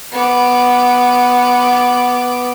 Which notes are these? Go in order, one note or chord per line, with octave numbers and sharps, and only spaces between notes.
B3 D6